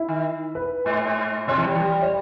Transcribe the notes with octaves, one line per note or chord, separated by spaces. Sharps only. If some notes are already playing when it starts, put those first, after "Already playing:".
Already playing: E4
D#3
B4
G#2
B2 C#5
E3
G3
E3
G3
C#5